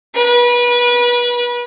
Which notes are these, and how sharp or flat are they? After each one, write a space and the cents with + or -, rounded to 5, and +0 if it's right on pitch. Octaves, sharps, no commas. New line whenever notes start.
B4 -30